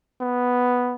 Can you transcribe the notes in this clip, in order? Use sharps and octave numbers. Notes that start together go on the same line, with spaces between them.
B3